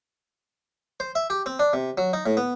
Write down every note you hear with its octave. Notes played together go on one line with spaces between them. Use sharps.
C5
E5
G4
C4
D4
C3
F#3
D#4
A2
B3